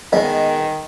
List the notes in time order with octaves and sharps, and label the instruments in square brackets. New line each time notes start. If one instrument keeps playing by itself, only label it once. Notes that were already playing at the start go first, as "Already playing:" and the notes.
[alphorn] D#3 [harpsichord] G#3 B3 [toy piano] D#5